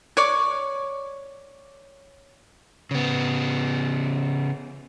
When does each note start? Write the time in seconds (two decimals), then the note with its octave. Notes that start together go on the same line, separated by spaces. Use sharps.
0.17 C#5 D5 D6
2.91 C#3 B3